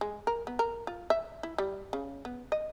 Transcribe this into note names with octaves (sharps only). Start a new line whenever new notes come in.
G#3
A#4
B3
A#4
F4
E5
E4
G3
C#3
B3
D#5